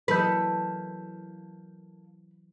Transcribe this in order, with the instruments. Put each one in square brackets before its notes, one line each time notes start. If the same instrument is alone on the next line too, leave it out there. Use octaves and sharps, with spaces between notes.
[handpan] E3 F#3 [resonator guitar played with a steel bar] A#3 A4 D#5 [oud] B4 [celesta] G6 B6